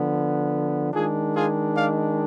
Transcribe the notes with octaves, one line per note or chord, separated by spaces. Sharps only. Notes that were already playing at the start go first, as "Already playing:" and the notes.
Already playing: D3 F3 B3
D#3 G#3 D4 F4 G#4
F4 G#4
D5 F5